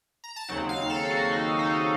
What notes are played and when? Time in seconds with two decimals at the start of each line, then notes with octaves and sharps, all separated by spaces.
0.24 A#5
0.36 A5
0.49 D#2 C#3 F#3 C4 D#4 F#5
0.69 F5
0.90 A4
1.11 F#4
1.32 D#4
1.59 D#4